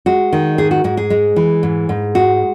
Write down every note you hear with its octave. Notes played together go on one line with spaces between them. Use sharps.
G#3 F#4
D#3
G#2 G#4
F#4
G#2 F#4
G#4
G#3
E3
G#2
G#2
G#3 F#4